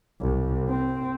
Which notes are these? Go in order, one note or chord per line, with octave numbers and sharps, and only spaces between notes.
C2
C4